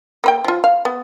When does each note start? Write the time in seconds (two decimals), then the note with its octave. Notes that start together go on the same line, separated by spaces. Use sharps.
0.24 A#3 B4 G5
0.44 F3 F4
0.64 F5
0.85 B3